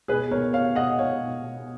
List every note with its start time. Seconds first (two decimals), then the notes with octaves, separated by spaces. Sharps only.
0.08 B2 G#4 B4
0.31 B2 A#4 C#5
0.53 B2 C#5 F5
0.75 B2 D#5 F#5
0.98 B2 C#5 F5
1.21 B2
1.43 B2